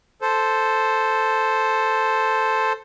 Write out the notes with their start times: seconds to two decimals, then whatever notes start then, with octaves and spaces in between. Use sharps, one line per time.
0.22 A4 C5